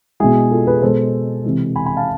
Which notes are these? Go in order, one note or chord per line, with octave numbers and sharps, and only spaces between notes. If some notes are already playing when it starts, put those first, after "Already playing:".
B2 G#3 E4 G#4
F4 A4
G#4 B4
B2 G#3 A4 C5
C3 E3 G#3
G#5 B5
G#5 B5
F5 A5